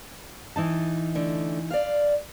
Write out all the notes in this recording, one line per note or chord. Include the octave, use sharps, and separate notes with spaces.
E3 D#4 A5
D3 A3
D5 F5